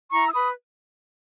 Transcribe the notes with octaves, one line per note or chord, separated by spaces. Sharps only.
E4 A#5 C#6
E6
B4 B5 D#6